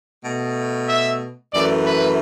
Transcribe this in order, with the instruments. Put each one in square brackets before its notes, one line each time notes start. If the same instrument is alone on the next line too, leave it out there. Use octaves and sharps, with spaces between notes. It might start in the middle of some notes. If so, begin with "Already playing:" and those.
[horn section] B2 A3
E5
F#2 E3 A3 D5
B4